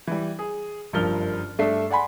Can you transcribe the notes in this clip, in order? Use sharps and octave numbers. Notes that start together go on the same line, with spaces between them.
E3 G3
G#4
F#1 G2 F3 A#4 F6 G7
G2 A3 D4 E5 C7
D5 F#5 G#5 B5 C6